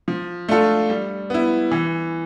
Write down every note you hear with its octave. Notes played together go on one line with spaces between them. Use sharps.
F3
A3 D4 F4 A4
G3
B3 E4
E3